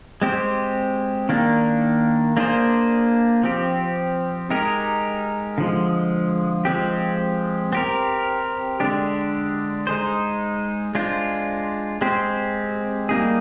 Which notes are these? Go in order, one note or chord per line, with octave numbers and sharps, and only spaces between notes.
G#3 C4 G4 C5
D#3 A#3 D4
A#3 D4 G#4 C5
F3 C4 G4
G#3 D#4 G4 A#4
D3 F3 G#3
F3 G#3 C4 G4
C4 G4 A#4
D3 G#3 D4 G4
G#3 D#4 G#4 C5
G#3 D4 F4 C5
G#3 C4 G4 C5
G3 A#3 D#4 G#4